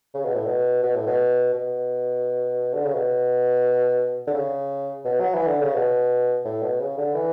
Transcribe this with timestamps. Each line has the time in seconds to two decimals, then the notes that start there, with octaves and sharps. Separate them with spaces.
0.14 C#3
0.25 B2
0.35 A2
0.46 B2
0.83 B2
0.95 A2
1.07 B2
1.53 B2
2.74 D3
2.85 C#3
2.94 B2
4.27 D3
4.34 C#3
5.05 B2
5.20 F#3
5.34 E3
5.47 D3
5.61 C#3
5.75 B2
6.45 A2
6.62 B2
6.80 C#3
6.98 D3
7.15 E3